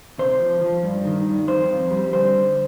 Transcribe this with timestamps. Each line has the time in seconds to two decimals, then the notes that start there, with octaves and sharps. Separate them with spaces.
0.18 C3 C5
0.40 F3
0.61 F3
0.83 G2
1.05 D#3
1.26 G2
1.47 F2 C5
1.69 F2
1.90 G3
2.12 D3 C5
2.35 D3